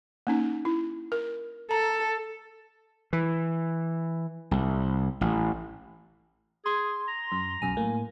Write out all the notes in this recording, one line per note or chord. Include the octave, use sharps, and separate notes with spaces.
A#3 C#4 D#4
E4
A#4
A4 A#5
E3
C2
A1
G#4 C6
A#5
F#2
B1 F#2 G#5
A2 A#3